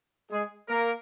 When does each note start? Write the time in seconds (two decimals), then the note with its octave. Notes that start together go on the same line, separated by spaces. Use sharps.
0.31 G#3 G#4
0.68 A#3 A#4